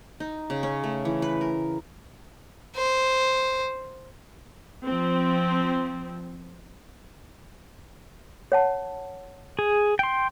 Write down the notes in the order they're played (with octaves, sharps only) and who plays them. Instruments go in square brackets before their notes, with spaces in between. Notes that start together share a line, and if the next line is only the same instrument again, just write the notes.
[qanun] D#4
C#3
C#4
A3
E3
B4
A#4
[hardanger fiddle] C5
[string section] F3 C4
[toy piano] C#5 F#5 A5
[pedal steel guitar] G#4
G5 C6